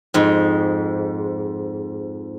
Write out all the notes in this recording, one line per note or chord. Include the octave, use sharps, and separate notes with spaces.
F2 G#2